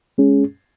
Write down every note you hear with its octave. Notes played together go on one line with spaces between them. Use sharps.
G#3 C#4 G#4